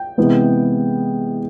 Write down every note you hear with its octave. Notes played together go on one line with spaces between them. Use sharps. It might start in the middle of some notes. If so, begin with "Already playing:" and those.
Already playing: G5
C3 E3 G#3 B3